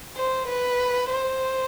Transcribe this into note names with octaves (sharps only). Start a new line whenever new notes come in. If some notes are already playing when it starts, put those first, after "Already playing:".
C5
B4
C5